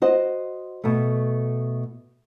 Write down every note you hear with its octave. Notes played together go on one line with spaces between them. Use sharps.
F#4 C5 D#5
B2 A3